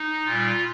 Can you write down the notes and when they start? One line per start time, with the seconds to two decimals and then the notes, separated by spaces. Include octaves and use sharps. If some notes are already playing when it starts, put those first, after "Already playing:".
Already playing: D#4
0.26 A#2 F4
0.31 G3